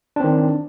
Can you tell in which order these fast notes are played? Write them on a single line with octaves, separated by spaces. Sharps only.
D4 C4 D#3